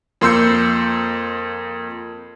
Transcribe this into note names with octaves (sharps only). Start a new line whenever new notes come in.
F2 A#3 C6 E6 G6 C#7